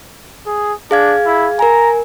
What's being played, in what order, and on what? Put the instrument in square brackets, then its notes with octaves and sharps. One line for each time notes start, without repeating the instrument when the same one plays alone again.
[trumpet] G#4
[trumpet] D4 [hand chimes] G#4 F5 G#6
[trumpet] E4
[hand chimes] A#4 G#5 [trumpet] A#5